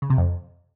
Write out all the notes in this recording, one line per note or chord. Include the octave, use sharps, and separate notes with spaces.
C#3
C3
F2